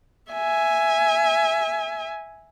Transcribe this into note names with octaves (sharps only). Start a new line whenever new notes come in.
E5 G#5